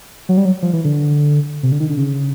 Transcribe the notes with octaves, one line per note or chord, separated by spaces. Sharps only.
F#3
G3
F#3
F3
E3
D3
C3
D3
D#3
D3
C#3